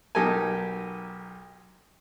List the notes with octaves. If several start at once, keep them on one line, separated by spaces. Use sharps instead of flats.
B1 D#4 G4 A4 A#4 G#5